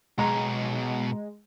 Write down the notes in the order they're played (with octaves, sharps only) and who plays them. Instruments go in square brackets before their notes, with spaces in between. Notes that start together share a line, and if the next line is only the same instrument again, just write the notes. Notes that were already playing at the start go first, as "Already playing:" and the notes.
[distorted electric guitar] B2 C#5 [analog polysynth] G#3 [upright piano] A#5